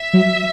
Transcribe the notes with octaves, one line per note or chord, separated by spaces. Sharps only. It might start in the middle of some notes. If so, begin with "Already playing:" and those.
Already playing: E5
F#3